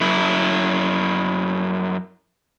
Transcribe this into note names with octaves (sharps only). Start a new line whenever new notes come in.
F#2 E4